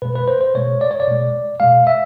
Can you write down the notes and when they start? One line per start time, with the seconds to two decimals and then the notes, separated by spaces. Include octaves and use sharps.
0.02 B2 G#3 B4
0.16 B4
0.28 C5
0.41 C5
0.55 B2 G#3 C#5
0.81 D5
0.91 C#5
1.00 D5
1.08 B2 G#3
1.60 B2 G#3 F5
1.87 E5